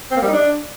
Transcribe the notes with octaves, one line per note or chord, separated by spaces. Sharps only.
C4
A#3
G3
D#4
D4